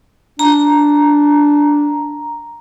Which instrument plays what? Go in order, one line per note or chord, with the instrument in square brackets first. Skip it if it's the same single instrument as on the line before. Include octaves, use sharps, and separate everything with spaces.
[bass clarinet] D4 [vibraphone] A#5